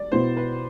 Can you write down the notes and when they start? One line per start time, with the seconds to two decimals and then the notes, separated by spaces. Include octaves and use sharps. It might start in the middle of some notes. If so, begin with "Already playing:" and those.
Already playing: D5
0.12 B2 B3 E4 C5
0.37 B4